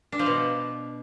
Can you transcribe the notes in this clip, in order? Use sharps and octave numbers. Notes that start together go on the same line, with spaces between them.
D4
F3
B2